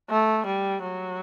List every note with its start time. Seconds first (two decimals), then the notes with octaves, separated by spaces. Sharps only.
0.10 A3
0.46 G3
0.82 F#3